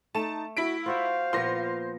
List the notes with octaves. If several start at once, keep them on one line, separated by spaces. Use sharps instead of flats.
A3 D#4 A5 E7
E4 F#4 B6 D7
F4 F#4 C5 E5 F5
A#2 F3 B3 C6 A#6